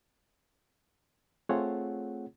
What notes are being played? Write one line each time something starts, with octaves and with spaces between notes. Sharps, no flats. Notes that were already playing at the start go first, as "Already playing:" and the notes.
A3 C4 F4 G#4 C#5 F#5